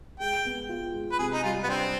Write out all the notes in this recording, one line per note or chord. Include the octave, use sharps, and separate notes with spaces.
G#3 G5
B3
F4
G#3
B4
C3 G#4
D#4
G3 F4
B3
C4 D4